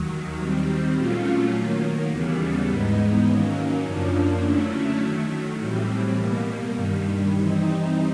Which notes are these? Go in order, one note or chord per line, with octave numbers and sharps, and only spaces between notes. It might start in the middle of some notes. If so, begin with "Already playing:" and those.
Already playing: D#2 D#3 F#3
D#3 G3 C4
A#2 F#3 A3 C#4 F4
D#3 F#3 A#3
D#2 C#3 E3 G3 B3
G#2 E3 G#3 B3 D#4
D#3 F#3 A#3 C#4
F#2 C#3 F3 A#3 D4
D3 F#3 A3 C#4 E4
D#3 F#3 A3
A2 E3 G3 C4
B2 G3 A#3
G2 D#3 G3
E3 G3 C4 D#4